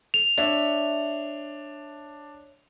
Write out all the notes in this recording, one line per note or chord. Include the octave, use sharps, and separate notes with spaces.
F7
D4 C#5 E5